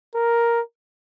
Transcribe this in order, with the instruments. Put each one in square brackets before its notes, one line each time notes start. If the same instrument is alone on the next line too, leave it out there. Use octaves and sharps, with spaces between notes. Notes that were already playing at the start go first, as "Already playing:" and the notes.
[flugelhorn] A#4